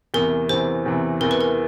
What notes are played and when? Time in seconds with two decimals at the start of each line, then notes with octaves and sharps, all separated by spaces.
0.14 E2 C3 E3 A#4
0.49 E2 C3 E3 C5
0.86 E2 C3 E3
1.21 E2 C3 E3 A#4
1.31 B4
1.41 A#4